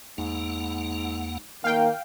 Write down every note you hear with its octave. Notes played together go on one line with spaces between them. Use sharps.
E2 G#2 A#3 F#5
D#3 A#3 F5 G5